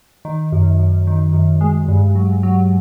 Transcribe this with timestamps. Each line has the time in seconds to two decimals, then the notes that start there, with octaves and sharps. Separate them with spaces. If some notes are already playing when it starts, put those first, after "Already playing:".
0.25 D#3
0.52 F#2
0.79 F#2
1.07 D#3
1.33 F#2
1.61 G#3
1.88 G2
2.15 F#3
2.43 F#3